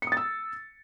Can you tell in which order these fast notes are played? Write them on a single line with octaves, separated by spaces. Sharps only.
C#7 D#6 A6 E6